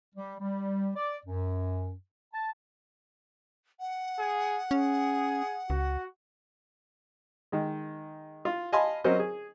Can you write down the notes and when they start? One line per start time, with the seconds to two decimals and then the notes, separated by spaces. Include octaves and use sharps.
0.14 G3
0.40 G3
0.95 D5
1.25 F#2
2.33 A5
3.80 F#5
4.19 G#4
4.71 C#4 G#4
5.70 C#2 F#4
7.52 D#3 G#3
8.45 F4
8.73 D#5 F5 G#5 A5 B5 C6
9.04 F#3 C4 C#4 A#4 C5 D#5
9.19 G#4